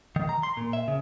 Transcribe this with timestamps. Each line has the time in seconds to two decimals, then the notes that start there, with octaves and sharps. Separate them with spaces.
0.16 D#3
0.29 A#5
0.43 C6
0.57 A#2
0.73 E5
0.88 C#3